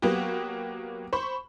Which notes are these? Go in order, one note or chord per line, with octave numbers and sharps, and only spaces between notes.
F#3 A#3 B3 F#4 G4
C5 B5 C#6